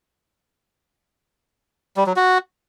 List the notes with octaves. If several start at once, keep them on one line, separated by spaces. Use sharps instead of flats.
G3
F#3
F#4